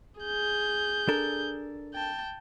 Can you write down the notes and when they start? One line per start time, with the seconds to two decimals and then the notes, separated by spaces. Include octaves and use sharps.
0.20 G#4 G6
1.08 D4 A4 A#4
1.94 G5 A5